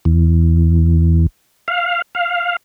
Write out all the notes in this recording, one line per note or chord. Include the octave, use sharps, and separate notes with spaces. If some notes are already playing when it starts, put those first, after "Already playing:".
E2
F5
F5